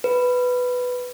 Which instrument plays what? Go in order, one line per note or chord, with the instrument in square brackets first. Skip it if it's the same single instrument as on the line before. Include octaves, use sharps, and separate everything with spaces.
[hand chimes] B4